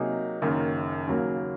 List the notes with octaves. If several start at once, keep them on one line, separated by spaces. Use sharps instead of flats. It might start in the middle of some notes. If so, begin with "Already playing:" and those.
Already playing: C3 F#3 A#3 D#4 G#4
F#1 F#2 D#3 A#3
D#2 C#3 F#3 A#3